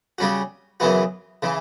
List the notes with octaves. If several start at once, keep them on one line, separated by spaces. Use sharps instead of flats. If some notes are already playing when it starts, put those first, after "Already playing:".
C#3 G3 C#4 F#4
F#2 C#3 E3 B3 F#4
C#3 E3